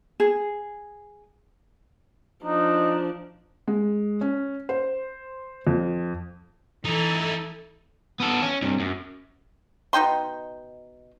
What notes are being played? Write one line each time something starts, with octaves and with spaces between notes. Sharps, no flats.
G#4
F3 D4 D#4
G#3
C#4
C5
F2
E3 D#4 E4 A4
B3 A4
C#4
G2 C3
F#2
B2 D#4 G5 C6